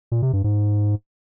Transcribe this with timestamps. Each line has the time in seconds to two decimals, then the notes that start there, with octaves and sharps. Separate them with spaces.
0.12 A#2
0.22 C3
0.33 G2
0.44 G#2